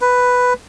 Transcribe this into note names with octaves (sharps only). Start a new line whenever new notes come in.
B4